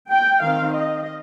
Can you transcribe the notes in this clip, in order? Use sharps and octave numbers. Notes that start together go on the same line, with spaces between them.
G5
D#3 C4 F5
D#5